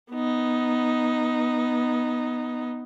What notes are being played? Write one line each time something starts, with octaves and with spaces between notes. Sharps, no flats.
B3 D#4